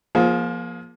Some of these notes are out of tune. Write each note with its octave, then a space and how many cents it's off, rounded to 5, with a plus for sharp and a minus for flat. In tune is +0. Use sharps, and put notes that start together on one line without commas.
F3 +0 A#3 +30 G#4 +25